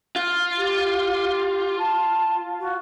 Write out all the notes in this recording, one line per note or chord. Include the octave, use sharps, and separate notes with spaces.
F4
G4
A5
F#4